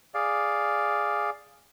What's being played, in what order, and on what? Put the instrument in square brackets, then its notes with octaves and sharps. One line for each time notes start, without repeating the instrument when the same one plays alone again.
[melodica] G#4 D5 F5